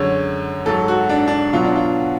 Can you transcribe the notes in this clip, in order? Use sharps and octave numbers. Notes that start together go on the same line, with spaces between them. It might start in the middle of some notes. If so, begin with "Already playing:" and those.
Already playing: F#2 D3 G#3 C#5
G#2 F#3 A4
F#4
D4
D4
B2 F#3 F4
D4
F4